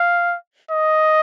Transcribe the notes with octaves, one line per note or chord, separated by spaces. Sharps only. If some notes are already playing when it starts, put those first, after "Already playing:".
Already playing: F5
D#5